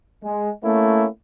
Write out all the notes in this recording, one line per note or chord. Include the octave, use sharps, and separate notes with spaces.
G#3
A3 A#3 C#4 E4